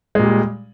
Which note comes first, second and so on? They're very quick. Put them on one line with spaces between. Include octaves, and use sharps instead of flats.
G#3 A#2 G3